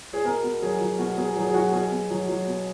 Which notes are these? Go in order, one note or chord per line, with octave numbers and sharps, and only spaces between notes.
G#4
B2 A#4
B2
F#3 G#4
F#3
B2 F#4
B2 G#4
F#3 G#4
G#4
F#3 F#4
B2 G#4
B2
F#3
F#3
B2